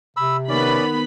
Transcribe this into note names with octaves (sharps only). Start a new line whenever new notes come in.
C3 B5 E6
D#3 B3 C#4 D5 B5